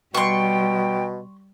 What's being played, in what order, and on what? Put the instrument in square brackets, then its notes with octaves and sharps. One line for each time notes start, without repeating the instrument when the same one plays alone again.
[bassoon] B2 [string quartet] G3 [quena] G5 [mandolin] C6 C#6